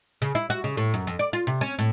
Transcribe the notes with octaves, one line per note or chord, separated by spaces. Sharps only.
C#3
E4
F#4
C#3
A2
F#2
F2
D5
F4
C3
C#4
A2